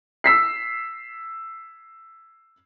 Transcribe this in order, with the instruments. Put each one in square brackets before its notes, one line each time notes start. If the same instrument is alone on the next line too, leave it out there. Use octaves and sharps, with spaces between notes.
[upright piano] E6 B6 C7